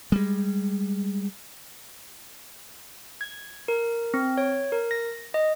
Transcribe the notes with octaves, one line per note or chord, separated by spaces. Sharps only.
G3 G#3
G#6
A#4
C4
C#5
A#4
A#6
D#5